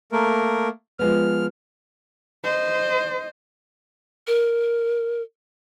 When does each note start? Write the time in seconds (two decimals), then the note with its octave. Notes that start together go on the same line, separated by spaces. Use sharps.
0.12 A3 A#3 A#4
0.99 F3 G#3 B3 F6
2.44 C5 D#5
4.27 A#4